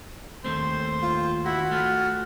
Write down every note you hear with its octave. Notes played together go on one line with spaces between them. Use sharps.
D#2 A3 C4 C5
F4
E4 F#4
A3 F4